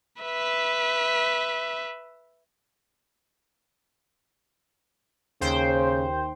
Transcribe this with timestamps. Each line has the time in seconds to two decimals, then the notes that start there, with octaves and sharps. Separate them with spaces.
0.22 B4 E5
5.41 D#2 C#3 C5 G5